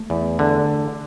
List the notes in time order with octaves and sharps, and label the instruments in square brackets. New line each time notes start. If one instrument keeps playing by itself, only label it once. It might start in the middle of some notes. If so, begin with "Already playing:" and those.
Already playing: [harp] A3
[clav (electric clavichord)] E2
D3